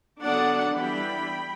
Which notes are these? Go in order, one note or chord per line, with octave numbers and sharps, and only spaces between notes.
D3 F#3 B3 D4 D5 F#5
E3 G3 B3 D4 G5 B5